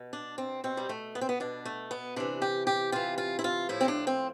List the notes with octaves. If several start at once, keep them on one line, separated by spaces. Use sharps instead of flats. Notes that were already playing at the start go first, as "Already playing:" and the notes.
Already playing: B2
D4
C4
B2 C4
G3
A3
B3
C4
B3
B2 D4
A3
B3
C3 E3 D4
G4
G4
C3 E3 F4
F4
E4
F4
A2 F3 E4
C4
D4
C4